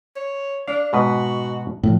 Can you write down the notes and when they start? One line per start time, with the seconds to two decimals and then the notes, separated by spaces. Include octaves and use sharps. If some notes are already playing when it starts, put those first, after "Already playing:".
0.16 C#5
0.68 D4 F5
0.93 G#2 B2 F#4 B4
1.83 A2 F3